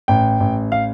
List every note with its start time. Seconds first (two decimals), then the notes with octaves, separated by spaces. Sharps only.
0.08 A1 G5
0.40 A1
0.72 F5